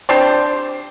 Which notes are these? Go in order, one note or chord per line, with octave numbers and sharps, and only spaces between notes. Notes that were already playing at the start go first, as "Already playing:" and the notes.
C4 D4 G4 C5